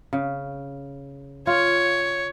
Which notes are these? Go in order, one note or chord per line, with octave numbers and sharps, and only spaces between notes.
C#3
F4 C#5